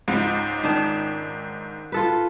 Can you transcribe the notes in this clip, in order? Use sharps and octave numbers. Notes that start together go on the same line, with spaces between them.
C#2 G#2
D#3 D4
F4 A4 B4